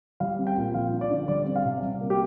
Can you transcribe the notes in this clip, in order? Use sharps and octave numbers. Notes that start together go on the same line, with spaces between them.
G3 F5
C4
G5
A#2
F3 F5
D4
D5
D3
G3 D5
C4
F5
C3
G3
A#3
G4